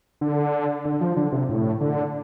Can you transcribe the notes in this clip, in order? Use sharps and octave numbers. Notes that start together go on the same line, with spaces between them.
D3
D3
F3
D3
C3
A2
D3